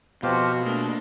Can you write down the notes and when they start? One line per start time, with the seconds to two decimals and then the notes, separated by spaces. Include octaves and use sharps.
0.23 F2 B2 F3 F#4 G4 C5 F5
0.64 A3 A#3 D4 G#4